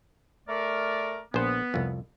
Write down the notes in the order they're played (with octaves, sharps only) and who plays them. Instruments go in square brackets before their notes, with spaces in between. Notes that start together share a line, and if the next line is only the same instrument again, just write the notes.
[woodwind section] A3 A#4 D5
[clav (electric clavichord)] A#1 C5 [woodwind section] B3
[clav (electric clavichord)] C2 F2